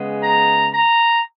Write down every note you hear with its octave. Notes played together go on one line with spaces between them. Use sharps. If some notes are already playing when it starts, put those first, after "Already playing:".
Already playing: C#3 G#3 B3
A#5
A#5